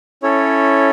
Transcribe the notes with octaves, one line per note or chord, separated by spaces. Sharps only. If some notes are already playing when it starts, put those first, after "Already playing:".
C#4 E4 A4 C#5